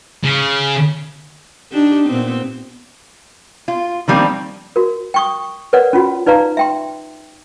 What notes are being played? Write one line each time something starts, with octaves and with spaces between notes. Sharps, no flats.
C#3
D4 D#4 G4
A#2 B3 C4
F4
D#3 F3 G3 A#3 C4 D4
F#4 A#4
G5 C#6 D#6
A#4 B4 C#5 D5 F#5
C#4 F4 F#4
D#4 B4 D5 F5 A#5
E5 G5 C6